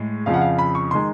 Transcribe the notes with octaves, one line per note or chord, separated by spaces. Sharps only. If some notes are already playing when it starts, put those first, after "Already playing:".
Already playing: A2 G#3
F2 C#3 F3 F5
F#5
F5
B5
C#6
D#3 G#3 C6